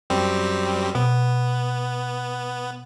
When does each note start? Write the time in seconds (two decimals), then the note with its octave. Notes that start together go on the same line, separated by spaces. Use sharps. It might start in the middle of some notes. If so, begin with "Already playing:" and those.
0.10 F#2 G3 C4
0.95 B2 B3